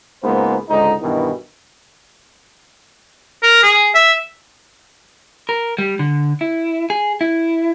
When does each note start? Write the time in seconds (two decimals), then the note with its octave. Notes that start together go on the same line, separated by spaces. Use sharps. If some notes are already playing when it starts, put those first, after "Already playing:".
0.22 C#2 G#2 A#3 B3 C5
0.69 C#2 G#2 D3 D#4
1.01 G2 B2 D#3 E3
3.43 A#4
3.63 G#4
3.95 E5
5.49 A#4
5.78 G3
5.99 D3
6.41 E4
6.90 G#4
7.21 E4